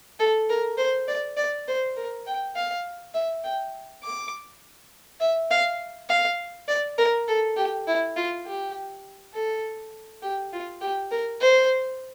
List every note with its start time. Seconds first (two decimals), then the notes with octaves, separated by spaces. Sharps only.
0.19 A4
0.50 A#4
0.78 C5
1.08 D5
1.37 D5
1.68 C5
1.97 A#4
2.27 G5
2.56 F5
3.14 E5
3.44 G5
4.03 D6
5.21 E5
5.51 F5
6.09 F5
6.68 D5
6.98 A#4
7.28 A4
7.57 G4
7.87 E4
8.16 F4
8.46 G4
9.34 A4
10.23 G4
10.53 F4
10.81 G4
11.11 A#4
11.40 C5